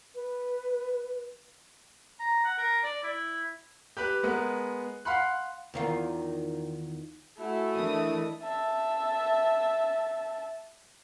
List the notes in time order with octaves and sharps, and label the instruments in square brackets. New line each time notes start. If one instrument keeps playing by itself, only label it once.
[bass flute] B4
[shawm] A#5
F#5
A#4
D5
E4
[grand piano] G4 B4 B5 F#6
G#3 B3 A#4
F5 F#5 B5 C6 F#6
[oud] E2 D#3 F4
[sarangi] A3 [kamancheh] E4 [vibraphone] F#4 F#5 G#5
[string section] E3 D4 D#6 [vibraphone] A#4 D#5
[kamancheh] E5 A5